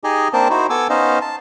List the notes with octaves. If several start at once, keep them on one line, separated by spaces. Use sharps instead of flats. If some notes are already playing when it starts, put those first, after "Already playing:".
D#4 G4 G#4 D#5 G#5
A#3 C4 D4 A#4 C5 A5
D#4 E4 F#4 C5
B3 A4 G#5 D6 E6
B3 C#4 D#4 C5 D#5 F5
A5